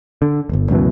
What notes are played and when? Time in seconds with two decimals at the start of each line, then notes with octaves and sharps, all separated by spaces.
0.22 D3
0.49 D1 G1
0.70 C#2 F#2 B2 E3